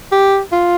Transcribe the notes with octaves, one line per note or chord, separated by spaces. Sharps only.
G4
F4